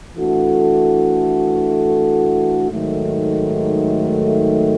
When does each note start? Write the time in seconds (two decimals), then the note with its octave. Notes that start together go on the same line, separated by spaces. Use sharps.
0.15 E3 A3 D4 F#4 A4
2.70 G#2 D#3 F#3 A3